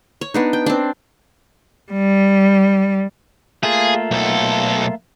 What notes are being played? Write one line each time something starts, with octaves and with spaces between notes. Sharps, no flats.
C#5
B3 D4 D#4
G5
C4 D4
G3
A3 A#3 F4 G#4
B1 A4